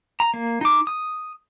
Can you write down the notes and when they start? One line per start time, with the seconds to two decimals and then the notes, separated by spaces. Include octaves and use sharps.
0.20 A#5
0.34 A#3
0.61 D#4 D6
0.87 D#6